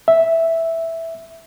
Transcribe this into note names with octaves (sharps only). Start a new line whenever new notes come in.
E5